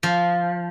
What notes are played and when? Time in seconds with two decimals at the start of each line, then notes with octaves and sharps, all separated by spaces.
0.03 F3